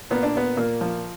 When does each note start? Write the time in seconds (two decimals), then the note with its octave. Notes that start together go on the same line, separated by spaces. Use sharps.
0.11 A#2 B3
0.23 D4
0.35 A#2 B3
0.57 A#2 A#3
0.81 F3